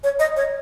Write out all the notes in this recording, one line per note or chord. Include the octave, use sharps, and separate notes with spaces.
C#5
D#5
C#5